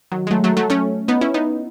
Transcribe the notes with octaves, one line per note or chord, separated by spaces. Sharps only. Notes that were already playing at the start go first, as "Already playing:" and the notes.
D#3 F#3
G#3
F#3 A3
F#3 A3
F#3 A3
A3 C#4
B3 D#4
C#4 E4
B3 D#4